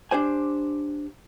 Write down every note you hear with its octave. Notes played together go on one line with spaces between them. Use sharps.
D4 G4 C5 G#5